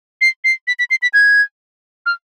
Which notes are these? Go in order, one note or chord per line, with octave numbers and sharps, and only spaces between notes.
C7
C7
B6
B6
C7
B6
G#6
F6